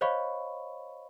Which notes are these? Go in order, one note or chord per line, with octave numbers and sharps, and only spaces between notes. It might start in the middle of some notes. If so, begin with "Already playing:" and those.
C5 C#5 D#5 F5 B5 C#6